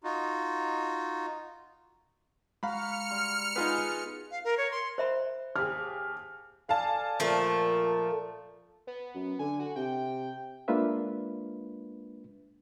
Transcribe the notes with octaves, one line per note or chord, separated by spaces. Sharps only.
D#4 F4 F#4
G#3 F#4 F5 A#5 B5 F6 C#7
G3 C6
B3 D#4 F4 G#4 B4
F5
A#4
C#5
C6
C5 E5 B5
D#2 G4 G#4 F6
A4 D5 F5 G#5 A5
A#2 F3 A3
B3
F#2
D3 G#5
F#4
C3 G5
G#3 A#3 D4 F4 B4 E5